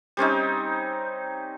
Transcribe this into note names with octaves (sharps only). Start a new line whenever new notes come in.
G3 C4 C#4 D#4